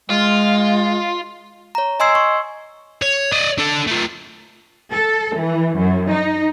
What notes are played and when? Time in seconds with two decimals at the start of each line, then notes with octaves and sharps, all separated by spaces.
0.10 G#3 F4
1.75 C#5 A#5
2.00 D#5 G#5 C6 E6 G#6 C7
2.15 C#6
3.02 C#5
3.32 D5 D#5
3.58 D4 A4
3.87 A3 F4
4.91 A4
5.35 E3
5.76 F#2
6.11 D#4